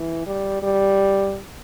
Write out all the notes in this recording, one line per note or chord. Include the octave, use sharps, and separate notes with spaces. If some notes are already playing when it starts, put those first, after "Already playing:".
Already playing: E3
G3
G3